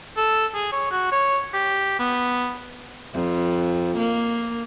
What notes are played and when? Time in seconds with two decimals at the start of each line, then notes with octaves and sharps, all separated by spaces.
0.17 A4
0.54 G#4
0.72 C#5
0.91 F#4
1.12 C#5
1.54 G4
1.99 B3
3.14 F2
3.98 A#3